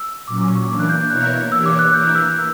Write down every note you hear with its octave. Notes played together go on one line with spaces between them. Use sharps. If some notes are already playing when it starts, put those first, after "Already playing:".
Already playing: E6
A#2 F#3 C#4 D6
D6
C#6
E3 A#3 D4 D6
F#6
G6
B2 A#3 E4 A#4 C#5 F#6
E3 A#3 D4 G4 C#5 E6
D6
F#6
E3 A#3 E4 A#4 G6
F#6
E6
F#6